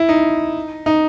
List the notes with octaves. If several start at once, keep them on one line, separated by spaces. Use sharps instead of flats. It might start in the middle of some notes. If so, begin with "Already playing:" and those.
Already playing: E4
D#4
D#4